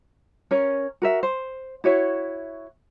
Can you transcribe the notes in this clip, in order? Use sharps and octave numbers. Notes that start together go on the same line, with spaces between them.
C#4 A#4 C#5
F#4 A#4 E5
C5
E4 F#4 C#5 E5